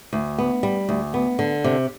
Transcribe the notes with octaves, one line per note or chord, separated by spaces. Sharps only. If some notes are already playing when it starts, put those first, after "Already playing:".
D2
B3
G3
D2
B3
D3
C3